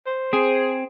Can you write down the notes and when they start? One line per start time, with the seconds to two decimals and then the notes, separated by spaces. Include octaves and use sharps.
0.06 C5
0.33 C4 G#4